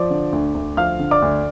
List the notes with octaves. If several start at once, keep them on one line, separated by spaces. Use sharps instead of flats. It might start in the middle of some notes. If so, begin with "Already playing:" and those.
Already playing: F3 D5 D6
D3
D2
D2
F3 F5 F6
D3
D5 D6
D2